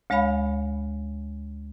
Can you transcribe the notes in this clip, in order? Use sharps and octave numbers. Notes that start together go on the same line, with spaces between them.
D2 G#3 C#5 F5 B5